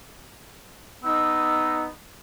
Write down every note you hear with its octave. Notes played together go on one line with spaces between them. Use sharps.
B3 D#4 E6